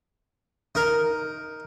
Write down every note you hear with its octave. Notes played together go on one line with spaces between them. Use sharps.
D#4 A#4